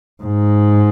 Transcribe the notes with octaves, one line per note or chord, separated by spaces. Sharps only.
G#2